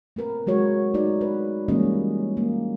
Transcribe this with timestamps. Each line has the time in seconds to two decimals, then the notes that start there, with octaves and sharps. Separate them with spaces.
0.16 A3 C4 A#4 B4
0.47 F#3 G#3 F#4 C#5
0.94 A3 D#4 F#4 D5
1.21 B4
1.68 E3 G3 G#3 A#3 C#4 D#5
2.37 A#3